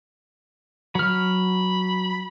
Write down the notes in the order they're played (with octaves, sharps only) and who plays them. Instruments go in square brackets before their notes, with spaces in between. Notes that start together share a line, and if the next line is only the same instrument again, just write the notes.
[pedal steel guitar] F#3 F6 [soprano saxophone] B5